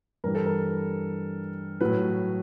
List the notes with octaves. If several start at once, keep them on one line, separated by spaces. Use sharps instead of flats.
G2 E3 G3 A#4
A4
A#4
A2 F#3 B4